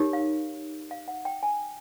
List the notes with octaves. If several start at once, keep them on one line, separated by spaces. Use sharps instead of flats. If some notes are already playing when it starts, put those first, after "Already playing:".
Already playing: D#4 G4 A#4 C#5
F5
F5
F#5
G5
G#5